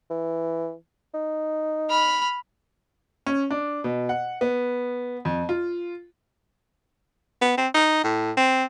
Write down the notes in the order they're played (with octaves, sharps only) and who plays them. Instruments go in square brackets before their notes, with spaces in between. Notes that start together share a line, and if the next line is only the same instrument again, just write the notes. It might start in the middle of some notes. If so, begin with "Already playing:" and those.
[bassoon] E3
D#4
[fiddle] B5 F6
[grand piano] C#4
D4
B2
F#5
B3
F2
F4
[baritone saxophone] B3
C4
D#4
A2
C4